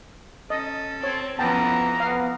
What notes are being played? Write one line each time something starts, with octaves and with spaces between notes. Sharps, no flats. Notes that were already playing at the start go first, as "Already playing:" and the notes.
C#4 A4 D#5
C4 C#5
F2 E3 B3 C#4 G5 A5 A#5
B3 F5 F#5